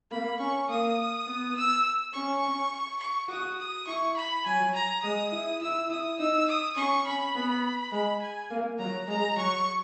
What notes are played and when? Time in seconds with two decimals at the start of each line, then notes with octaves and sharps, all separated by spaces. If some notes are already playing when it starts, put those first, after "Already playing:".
0.11 A#3 B5
0.39 C#4 C#6
0.69 A#3 D#6
1.27 B3
1.56 E6
2.13 C#4 C#6
3.00 C#6
3.29 F#4 D#6
3.58 D#6
3.87 E4 C#6
4.16 B5
4.46 F#3 G#5
4.74 A#5
5.03 G#3 D#6
5.32 E4
5.61 E4 E6
5.90 E4 D#6
6.19 D#4 E6
6.48 D#6
6.76 C#4 C#6
7.06 C#4 B5
7.35 B3
7.92 G#3 B5
8.21 G#5
8.51 A#3
8.79 F#3 A#5
9.08 G#3 A#5
9.36 F#3 C#6